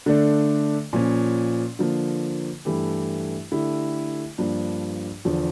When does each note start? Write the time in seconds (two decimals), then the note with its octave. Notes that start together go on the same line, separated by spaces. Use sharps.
0.06 D3 A3 D4
0.93 A#2 F3 C#4
1.79 D3 F3 A#3
2.65 G2 E3 A3 E4 G4
3.52 D3 A3 E4 G4
4.38 G2 F3 A#3 D4
5.25 E2 D3 F3